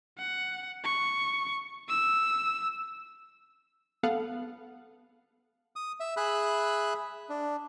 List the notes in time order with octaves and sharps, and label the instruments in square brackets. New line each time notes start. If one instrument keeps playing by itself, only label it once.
[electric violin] F#5
C#6
E6
[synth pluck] B3 A4 F5 F#5
[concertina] D#6
E5
G#4 E5 B5 F#6
D4